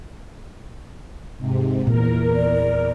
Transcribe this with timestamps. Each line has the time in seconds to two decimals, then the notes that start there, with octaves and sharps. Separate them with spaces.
1.38 G#2 C3
1.87 E2 A#2 A#4
2.36 D5